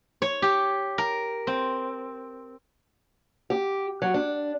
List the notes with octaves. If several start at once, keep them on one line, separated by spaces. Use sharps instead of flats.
C#5
G4
A#4
C4
G4
F#3
D4